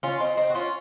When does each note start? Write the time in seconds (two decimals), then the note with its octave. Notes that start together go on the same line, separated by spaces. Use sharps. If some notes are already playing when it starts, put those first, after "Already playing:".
0.03 C#4 F4
0.20 C4 D#4
0.37 C4 D#4
0.50 F#4
0.55 C#4 F4